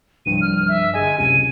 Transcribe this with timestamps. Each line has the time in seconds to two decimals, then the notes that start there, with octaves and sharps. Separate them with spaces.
0.26 C2 G2 F3 D#7
0.41 F6
0.68 E5
0.94 G1 G#4 D#5 G#5
1.18 C#2 F#2 C3 D#7